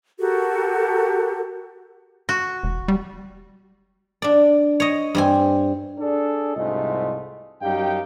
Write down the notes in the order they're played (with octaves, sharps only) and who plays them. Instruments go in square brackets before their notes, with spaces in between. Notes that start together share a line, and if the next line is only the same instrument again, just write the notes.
[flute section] F#4 G4 A4 A#4
[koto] F#4
[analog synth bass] E1
G3
[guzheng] D4 D5
C#5 D#5
G2 C4 G#5
[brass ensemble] D4 G#4 A4 D5
C2 G#2 A3 F4 D#5
F#2 G3 D#4 G4 F5 G5